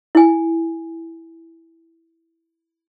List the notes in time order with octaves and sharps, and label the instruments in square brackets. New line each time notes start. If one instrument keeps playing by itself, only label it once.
[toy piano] E4 G#5